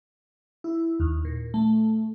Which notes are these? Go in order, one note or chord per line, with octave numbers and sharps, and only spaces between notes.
E4
D#2
A#2
A3